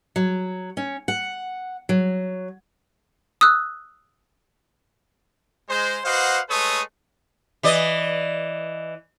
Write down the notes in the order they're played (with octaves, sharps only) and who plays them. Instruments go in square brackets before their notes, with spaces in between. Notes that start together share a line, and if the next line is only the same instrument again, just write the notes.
[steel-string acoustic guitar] F#3
C#4
F#5
F#3
[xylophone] D#6 E6 F#6
[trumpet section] G#3 C5
F#4 B4 C5 D#5 F5 F#5
G#3 A3 A4 B4 C#5 D#6
[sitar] E3 D5 D#5